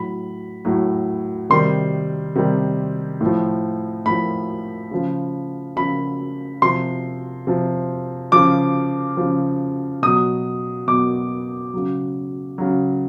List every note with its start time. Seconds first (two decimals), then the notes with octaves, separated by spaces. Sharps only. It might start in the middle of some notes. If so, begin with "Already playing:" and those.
Already playing: A2 F#3 B5
0.65 A2 F#3
1.50 C3 D#3 G3 C6
2.35 C3 D#3 G3
3.21 A2 F3
4.06 A2 F3 B5
4.91 C#3 F3
5.76 C#3 F3 B5
6.62 C3 F3 C6
7.47 C3 F3
8.32 C#3 F3 D6
9.17 C#3 F3
10.02 B2 F#3 D#6
10.87 B2 F#3 D6
11.73 C#3 F#3
12.58 C#3 F#3